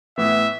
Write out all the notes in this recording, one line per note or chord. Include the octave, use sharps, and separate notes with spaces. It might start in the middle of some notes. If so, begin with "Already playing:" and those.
A2 E3 B3 E5